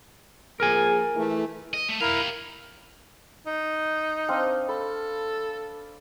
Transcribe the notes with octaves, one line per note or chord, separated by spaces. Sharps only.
F3 A#3 G#4 A#4 G#5
E3 A3
D#5
A3
E4 G4 A#4 F5
D#4
C4 D4 F5
A4 B5